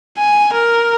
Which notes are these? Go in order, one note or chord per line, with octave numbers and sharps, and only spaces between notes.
G#5
A#4